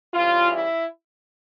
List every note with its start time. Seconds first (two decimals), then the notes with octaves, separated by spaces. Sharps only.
0.14 C#3 E3 G3 F4
0.52 E4